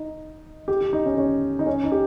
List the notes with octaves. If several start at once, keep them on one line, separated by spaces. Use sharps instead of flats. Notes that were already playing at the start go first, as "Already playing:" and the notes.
Already playing: D#4
G4
G4
D#4
C#4
C#4
D#4
C#4
D#4
G4